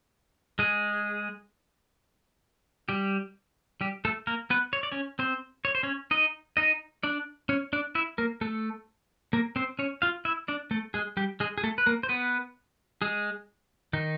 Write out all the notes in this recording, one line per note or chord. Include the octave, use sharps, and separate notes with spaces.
G#3 G#4
G3 G4
G3 G4
A3 A4
A#3 A#4
B3 B4
C#5
D5
C#4 C#5
C4 C5
C#5
C5
C#4 C#5
D#4 D#5
D#4 D#5
D4 D5
C#4 C#5
D4 D5
E4 E5
A#3 A#4
A3 A4
A#3 A#4
C4 C5
C#4 C#5
F4 F5
E4 E5
D4 D5
A3 A4
G#3 G#4
G3 G4
G#3 G#4
G#4
A3 A4
B4
A#3 A#4
C5
B3 B4
G#3 G#4
D#3 D#4